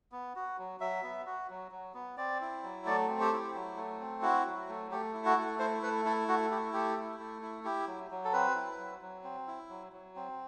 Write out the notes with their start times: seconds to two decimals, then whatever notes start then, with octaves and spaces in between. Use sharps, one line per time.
0.12 B3
0.36 F#4
0.58 F#3
0.80 F#3 E5
1.03 B3
1.26 F#4
1.50 F#3
1.72 F#3
1.94 B3
2.17 C4 D5
2.41 E4
2.63 F#3
2.85 A3 D5
3.08 C4
3.20 G4
3.32 E4
3.55 F#3
3.77 A3
4.00 C4
4.22 E4 F#4
4.46 F#3
4.69 A3
4.91 A3 G4
5.14 E4
5.26 F#4
5.37 A3
5.59 E4 C5
5.83 A3 B4
6.05 E4 A4
6.28 A3 F#4
6.50 E4 G4
6.73 A3 G4
6.97 E4
7.20 A3
7.42 E4
7.64 E4 G4
7.87 F#3
8.11 F#3
8.25 A4
8.33 C4 B4
8.56 E4
8.78 F#3
9.01 F#3
9.24 C4
9.47 E4
9.69 F#3
9.92 F#3
10.16 C4